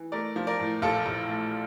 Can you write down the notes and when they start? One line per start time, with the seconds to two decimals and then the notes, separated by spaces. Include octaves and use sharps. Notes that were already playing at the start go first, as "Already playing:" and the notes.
Already playing: E3
0.12 A3 A#4 D5
0.36 F3
0.47 A#4 D5
0.60 A2
0.82 A#1 F4 A4
1.06 A#1
1.29 A3